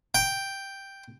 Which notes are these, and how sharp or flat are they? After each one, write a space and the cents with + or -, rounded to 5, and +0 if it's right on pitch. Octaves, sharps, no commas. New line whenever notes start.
G5 +0